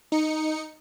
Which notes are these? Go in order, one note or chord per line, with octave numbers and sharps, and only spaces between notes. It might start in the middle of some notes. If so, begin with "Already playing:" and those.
D#4 C#7